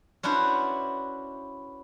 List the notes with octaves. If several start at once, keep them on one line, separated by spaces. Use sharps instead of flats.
C#4 D4 E4 F#4 B4 C5